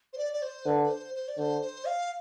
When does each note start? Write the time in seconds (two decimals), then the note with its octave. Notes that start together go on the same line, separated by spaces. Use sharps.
0.13 C5
0.17 D5
0.33 D5
0.42 C5
0.65 D3 B4
0.83 B4
0.89 C5
1.14 C5
1.28 D5
1.38 D3 C5
1.61 C5
1.85 F5